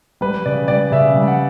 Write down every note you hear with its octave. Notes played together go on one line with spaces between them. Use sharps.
G3 B4
C#3 D5
G3 D5
C#3 E5
G3
F#5